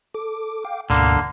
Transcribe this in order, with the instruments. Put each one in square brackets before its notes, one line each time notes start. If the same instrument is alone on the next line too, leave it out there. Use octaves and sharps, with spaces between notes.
[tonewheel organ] A4 D6
F5 G5 D6
[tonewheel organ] D2 G#2 B2 [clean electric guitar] D3 A#3